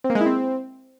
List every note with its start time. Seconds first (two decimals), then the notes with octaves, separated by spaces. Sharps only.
0.04 C4
0.10 A#3
0.15 G#3
0.21 E4
0.26 C4